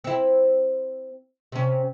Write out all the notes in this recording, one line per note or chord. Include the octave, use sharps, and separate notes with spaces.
C4 E4
C3 C#4